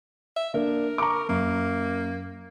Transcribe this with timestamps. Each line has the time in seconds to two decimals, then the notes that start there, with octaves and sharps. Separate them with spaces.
0.36 E5
0.54 A#3 D4 A#4
0.98 A#5 C#6 D6
1.29 F#2 A#3